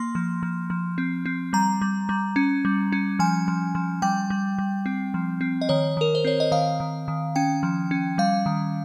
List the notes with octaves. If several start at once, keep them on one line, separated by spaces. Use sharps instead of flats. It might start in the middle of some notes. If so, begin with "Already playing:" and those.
Already playing: A#3 C6
F3
F3
F3
C4
C4
G3 A#5
G3
G3
C#4
G3
C#4
F3 G#5
F3
F3
G3 G5
G3
G3
C4
F3
C4
D#5
D#3 C#5
D#3 A#4
C5
C4 C#5
D#5
D#3 F5
D#3
D#3
C#4 G5
F3
C#4
G3 F5
D#3